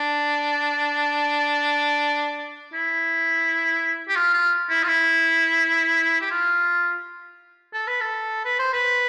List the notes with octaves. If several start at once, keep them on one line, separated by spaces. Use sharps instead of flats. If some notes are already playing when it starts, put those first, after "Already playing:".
Already playing: D4
E4
G4
F4
F4
E4
F4
E4
G4
F4
A4
B4
A4
B4
C5
B4